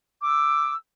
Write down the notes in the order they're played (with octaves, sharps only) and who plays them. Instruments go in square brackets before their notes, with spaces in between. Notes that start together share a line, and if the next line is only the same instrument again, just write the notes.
[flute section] D6 E6